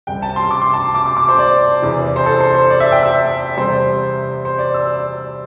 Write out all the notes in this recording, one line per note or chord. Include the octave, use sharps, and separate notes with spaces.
C2 C3 G3 G5
A5
C6
D6
C6
A5
D6
D6
D6
C5
D5
E2 C3 E3
C5
A4
C5
C5
D5
E5
G5
E5
E2 C3 G3 C4 C5
C5
D5
E6